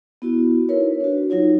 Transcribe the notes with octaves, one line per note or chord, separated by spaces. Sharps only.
B3 E4 F#4
D#4 E4 A#4 B4 C#5
D4 F#4
F#3 D#4 F4 C#5